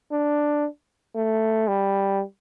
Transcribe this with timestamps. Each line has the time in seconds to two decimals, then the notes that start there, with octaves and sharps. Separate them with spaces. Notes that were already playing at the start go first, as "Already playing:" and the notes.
0.11 D4
1.15 A3
1.68 G3